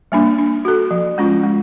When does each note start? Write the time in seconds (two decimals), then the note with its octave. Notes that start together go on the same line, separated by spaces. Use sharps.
0.12 G3 A#3 D4
0.38 D4
0.65 F#4 A4
0.91 F3
1.18 G#3 C#4 F4
1.44 G#3